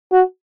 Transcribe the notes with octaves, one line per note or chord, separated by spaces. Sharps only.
F#4